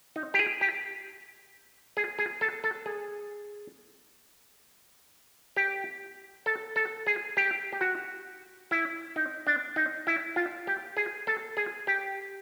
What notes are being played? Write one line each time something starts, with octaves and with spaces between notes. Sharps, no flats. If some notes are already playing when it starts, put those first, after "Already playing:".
D#4
G4
G#4
G4
G#4
G#4
A4
A4
G#4
G4
A4
A4
G#4
G4
G4
F#4
E4
D#4
D4
D#4
E4
F4
G4
G#4
A4
G#4
G4